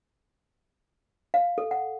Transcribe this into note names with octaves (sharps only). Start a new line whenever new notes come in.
F5
A4
F#5